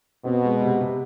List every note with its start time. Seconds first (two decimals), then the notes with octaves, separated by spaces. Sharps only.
0.25 B2 C4
0.44 G#3
0.62 C3
0.81 C3